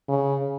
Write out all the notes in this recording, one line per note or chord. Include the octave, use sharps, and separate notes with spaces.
C#3